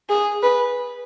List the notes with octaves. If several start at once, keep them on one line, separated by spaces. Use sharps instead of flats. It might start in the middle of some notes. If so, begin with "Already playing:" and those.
G#4
B4